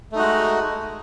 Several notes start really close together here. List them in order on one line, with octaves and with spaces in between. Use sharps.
A3 D#4 F#4 G#3